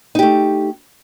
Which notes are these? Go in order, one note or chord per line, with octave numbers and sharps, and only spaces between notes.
A3 D#4 G4